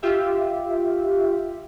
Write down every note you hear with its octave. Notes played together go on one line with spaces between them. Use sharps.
F4 G4 E5